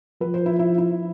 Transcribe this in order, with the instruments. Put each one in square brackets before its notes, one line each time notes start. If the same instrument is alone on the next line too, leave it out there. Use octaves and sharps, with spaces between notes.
[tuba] F3 [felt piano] B4
[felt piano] C5
E4
E4
E4